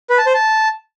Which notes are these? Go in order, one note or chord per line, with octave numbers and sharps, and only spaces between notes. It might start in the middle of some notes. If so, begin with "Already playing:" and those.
B4
A5
C5
A5